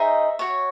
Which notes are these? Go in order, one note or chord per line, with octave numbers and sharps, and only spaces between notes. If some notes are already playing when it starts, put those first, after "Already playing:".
Already playing: D#4 G#4 C5 D#5 E5
F#4 C#5